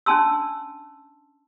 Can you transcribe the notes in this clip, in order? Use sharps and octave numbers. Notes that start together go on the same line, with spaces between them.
C#4 D4 G#5 A5 C6 E6